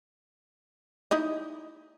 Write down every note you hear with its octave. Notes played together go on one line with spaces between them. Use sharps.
D#4 E4 D#5